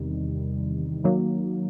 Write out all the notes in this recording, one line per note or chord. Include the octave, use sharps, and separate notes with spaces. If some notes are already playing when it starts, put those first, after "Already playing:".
Already playing: E2 C3 D#3 G3
D#3 F#3 A#3